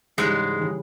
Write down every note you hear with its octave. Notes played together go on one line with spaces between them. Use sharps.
G#2 C#3 E3 G3 G#3
C#3 E3 G3